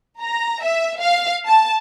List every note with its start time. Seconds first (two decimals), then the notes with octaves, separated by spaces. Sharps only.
0.20 A#5
0.64 E5
1.00 F5
1.47 A5